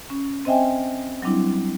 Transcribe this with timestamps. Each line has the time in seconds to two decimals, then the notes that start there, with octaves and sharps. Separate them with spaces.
0.10 C#4
0.45 C4 C5 D#5 E5 G5 G#5
1.22 F#3 G3 C4 D4 E4